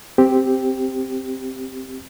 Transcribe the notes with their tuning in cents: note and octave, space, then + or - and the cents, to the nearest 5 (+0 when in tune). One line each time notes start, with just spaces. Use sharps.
C4 +0 G4 +0